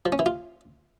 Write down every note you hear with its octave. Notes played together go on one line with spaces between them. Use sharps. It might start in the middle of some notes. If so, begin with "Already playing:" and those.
F3
C#4
E3
F4